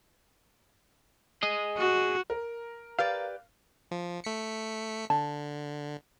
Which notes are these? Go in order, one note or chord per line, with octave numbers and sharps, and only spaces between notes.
G#4 D#5
F#4
A#4
G4 B4 D5 F5
F3
A3 B6 C#7
D3 A5